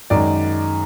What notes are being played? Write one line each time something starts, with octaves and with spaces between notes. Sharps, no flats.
F#2 D#3 G#3 D5